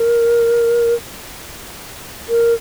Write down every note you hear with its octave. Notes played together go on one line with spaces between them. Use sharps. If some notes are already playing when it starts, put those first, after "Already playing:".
Already playing: A#4
A#4